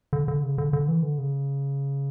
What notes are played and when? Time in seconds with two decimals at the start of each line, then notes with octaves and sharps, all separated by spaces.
0.13 D3
0.28 D3
0.43 C#3
0.58 D3
0.73 D3
0.88 E3
1.03 D3
1.18 C#3